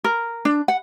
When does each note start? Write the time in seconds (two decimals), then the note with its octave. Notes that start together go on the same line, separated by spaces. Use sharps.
0.04 A#4
0.45 D4
0.68 F#5